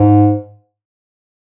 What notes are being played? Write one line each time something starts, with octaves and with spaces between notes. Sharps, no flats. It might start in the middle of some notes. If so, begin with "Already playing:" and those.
Already playing: G#2